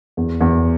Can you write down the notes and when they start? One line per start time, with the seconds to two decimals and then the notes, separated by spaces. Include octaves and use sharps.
0.17 E2
0.40 E2